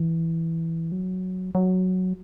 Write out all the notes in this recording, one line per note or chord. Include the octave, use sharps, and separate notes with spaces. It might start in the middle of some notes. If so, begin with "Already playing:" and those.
Already playing: E3
F#3
F#3